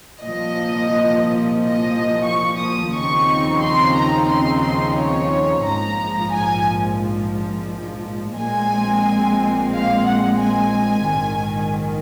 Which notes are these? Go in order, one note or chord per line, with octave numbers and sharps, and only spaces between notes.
C2 A#2 F3 D#5
D#5
C#6
D#6
D#2 C#3 F3 C4 D#4 C#6
C6
A#5
C6
C6
C#5
A#1 G#2 F3 A#5
G#5
A#1 A#2 G#3 C4 G#5
F5
F#5
G#5
A#1 G#2 D#3